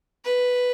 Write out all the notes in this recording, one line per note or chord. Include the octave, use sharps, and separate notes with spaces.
B4